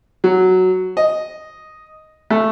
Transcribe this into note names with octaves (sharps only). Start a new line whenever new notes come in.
F#3
D#5
A3